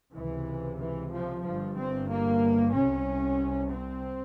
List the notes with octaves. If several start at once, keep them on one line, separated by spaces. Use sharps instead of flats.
C#2 C3 E3
E3
F3
G1 G2 F3
C4
A#3
C2 C3 C#4
C4